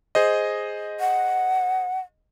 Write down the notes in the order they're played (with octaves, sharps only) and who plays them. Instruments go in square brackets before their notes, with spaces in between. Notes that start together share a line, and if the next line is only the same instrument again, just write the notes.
[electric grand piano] G#4 C5 D#5
[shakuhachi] F#5